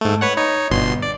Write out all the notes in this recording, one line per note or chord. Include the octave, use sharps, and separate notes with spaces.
G#2 A3
B4 C#5 F#5
D#4 C#5
G1 B2 C6
D5